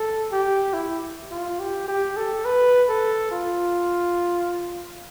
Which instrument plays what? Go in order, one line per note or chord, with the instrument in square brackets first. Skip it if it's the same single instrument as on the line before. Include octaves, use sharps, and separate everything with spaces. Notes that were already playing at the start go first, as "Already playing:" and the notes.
Already playing: [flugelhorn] A4
G4
E4
F4
G4
G4
A4
B4
A4
F4